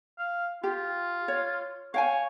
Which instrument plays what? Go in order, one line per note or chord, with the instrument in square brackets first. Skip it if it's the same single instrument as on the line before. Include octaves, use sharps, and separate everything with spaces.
[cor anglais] F5
[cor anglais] F4 [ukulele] G4
[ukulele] C#5
[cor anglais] C#5 [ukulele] F5 G5 G#5